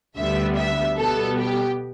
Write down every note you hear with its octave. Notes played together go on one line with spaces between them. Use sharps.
D2 D3 G3 B3 E5
E5
B2 G3 B3 A4
G4